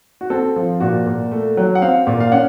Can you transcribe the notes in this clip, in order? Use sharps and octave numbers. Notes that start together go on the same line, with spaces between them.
F#4
C4 A4
F3
A#2 F#4
A#2
A3
F#3
F#5
C4 F5
A#2
F5
C#4 F#5